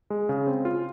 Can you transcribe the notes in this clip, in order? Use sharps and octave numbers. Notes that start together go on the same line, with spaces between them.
G#3
C#3
C4
F4